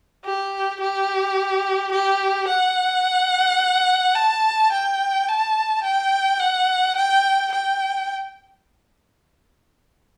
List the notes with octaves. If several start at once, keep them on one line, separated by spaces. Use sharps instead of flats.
G4
G4
G4
F#5
A5
G5
A5
G5
F#5
G5
G5